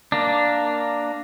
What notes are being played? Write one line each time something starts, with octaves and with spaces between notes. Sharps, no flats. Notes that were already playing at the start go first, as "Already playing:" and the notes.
A#3 D4